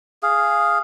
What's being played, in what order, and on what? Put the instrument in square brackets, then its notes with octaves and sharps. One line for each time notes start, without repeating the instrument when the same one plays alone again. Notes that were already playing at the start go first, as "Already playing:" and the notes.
[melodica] G#4 F5